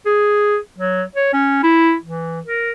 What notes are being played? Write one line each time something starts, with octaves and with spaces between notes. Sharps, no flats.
G#4
F#3
C#5
C#4
E4
E3
A#4